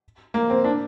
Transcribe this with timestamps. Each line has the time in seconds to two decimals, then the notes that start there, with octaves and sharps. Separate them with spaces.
0.34 A#3
0.50 C4
0.64 D4